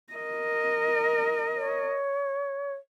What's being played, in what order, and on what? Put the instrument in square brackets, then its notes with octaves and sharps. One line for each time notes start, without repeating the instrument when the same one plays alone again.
[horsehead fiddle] A#4 D#5
[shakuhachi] C#5